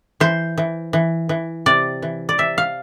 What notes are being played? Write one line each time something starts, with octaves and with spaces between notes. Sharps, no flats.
E3 C5
E3
E3
E3
C3 D5
E3
D5
C3 E5
F5